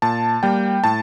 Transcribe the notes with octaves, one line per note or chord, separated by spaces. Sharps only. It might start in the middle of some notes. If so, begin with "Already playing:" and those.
A#2 A5
G3 A#3 G5
A2 A5